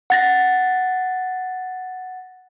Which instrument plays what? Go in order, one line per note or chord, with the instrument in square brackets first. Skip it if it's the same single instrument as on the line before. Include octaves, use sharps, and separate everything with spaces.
[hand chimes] F#5 A6 A#6